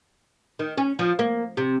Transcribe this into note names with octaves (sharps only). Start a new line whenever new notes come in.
D#3
C#4
F3
A#3
C3